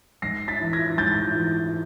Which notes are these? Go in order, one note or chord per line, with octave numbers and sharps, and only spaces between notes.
G#2 A#6 C7
A6 B6
E3
G#6 A#6
G#2 G6 A6
E3